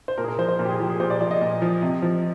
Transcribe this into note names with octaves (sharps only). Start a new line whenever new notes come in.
C5
A#2 A#4
G#4
A#4
F3 C5
C5
A#2 A#4
G4
G#4
F3 G4
G#4
A#2 C5
D5
F3 D5
D#5
A#2
F3
C3
F3